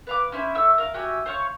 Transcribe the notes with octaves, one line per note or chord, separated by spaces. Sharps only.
B4 F5 D6
C#4 E4 C5
A3 E5 C#6 E6
A#4 F5
F#4 G4 E5 G#5
C5 C#5 F5 C#6